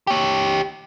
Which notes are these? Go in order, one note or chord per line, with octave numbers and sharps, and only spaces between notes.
G4 C#5